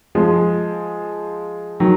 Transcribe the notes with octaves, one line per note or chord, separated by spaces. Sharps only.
F3 G#3
D#3 F#3